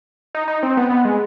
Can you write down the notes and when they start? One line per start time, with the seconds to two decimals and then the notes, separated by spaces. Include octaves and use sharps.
0.35 D#4
0.48 D#4
0.63 C4
0.77 B3
0.90 B3
1.05 G#3